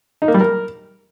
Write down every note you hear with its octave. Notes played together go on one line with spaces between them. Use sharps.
D#4
A#3
G3
A#4